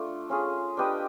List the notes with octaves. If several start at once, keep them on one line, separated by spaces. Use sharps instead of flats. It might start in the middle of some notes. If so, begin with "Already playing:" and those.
Already playing: A3 D4 F4
C#4 F4 G#4
D4 G4 B4 D#5